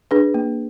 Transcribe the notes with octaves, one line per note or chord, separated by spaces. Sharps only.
D4 G#4 B4
A#3